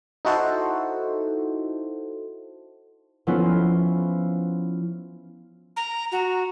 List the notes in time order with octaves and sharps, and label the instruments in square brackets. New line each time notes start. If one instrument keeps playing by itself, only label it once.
[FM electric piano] D#4 E4 F#4 A4 C5
[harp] F3 B3 C#4 E4 F4
[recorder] A#5
F#4